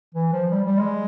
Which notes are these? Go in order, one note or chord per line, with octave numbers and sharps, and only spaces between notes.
E3
F3
G3
G3
G#3